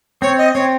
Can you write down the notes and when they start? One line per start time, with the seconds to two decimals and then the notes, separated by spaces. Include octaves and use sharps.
0.22 C4 C#5
0.38 D#5
0.54 C4 C#5